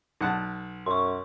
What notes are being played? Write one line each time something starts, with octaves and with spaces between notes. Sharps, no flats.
B1 F#5 A5
F#2 C6 C#6